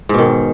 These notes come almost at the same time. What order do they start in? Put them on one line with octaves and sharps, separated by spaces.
G#2 B2 D#3